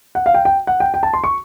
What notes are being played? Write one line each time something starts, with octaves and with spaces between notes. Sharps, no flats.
F#5
F5
G5
G5
F#5
G5
G5
A5
C6
C#6